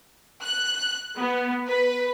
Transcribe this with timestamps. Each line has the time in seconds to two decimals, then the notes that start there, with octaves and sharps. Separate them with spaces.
0.43 F#6
1.18 B3
1.67 B4